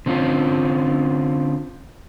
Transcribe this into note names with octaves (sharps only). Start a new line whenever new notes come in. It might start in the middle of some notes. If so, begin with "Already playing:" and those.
D3 C4 C#4 F4